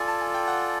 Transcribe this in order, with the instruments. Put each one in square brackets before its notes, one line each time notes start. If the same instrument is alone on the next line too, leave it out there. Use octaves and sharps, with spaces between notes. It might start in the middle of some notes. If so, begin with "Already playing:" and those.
Already playing: [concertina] F4 A4 D5 [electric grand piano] G#5
[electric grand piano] A5
G#5
G5
F#5